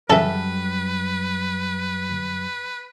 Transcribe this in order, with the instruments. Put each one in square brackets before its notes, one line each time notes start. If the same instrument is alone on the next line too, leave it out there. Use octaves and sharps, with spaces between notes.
[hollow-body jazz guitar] F#2 G3 [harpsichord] C#3 E3 [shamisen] A4 [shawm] B4